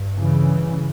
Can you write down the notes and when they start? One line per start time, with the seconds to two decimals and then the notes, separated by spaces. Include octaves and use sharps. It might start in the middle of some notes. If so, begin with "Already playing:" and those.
Already playing: G2
0.17 C#3 E3